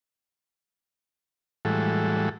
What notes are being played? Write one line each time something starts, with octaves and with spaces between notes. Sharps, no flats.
A2 E3 G3 G#3 F#4 A4